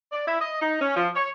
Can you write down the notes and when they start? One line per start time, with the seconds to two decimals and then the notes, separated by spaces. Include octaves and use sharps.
0.12 D5
0.28 E4
0.41 D#5
0.61 D#4
0.81 C#4
0.96 F3
1.16 C#5